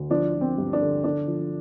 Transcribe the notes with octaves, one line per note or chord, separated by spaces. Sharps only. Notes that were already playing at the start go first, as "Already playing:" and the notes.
Already playing: D2
F3 D4
F3
C4
G2
D4
D3
D3 D4
F3